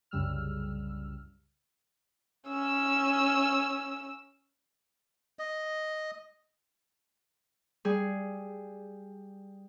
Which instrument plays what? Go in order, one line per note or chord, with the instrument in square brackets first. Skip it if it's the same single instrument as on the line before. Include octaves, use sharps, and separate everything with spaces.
[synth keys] C2 F#2 C#3 G3 E6 F6
[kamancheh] C#4 E6
[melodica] D#5
[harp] G3 G#4